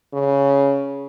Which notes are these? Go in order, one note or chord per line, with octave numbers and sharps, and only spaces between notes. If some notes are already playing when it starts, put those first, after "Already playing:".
C#3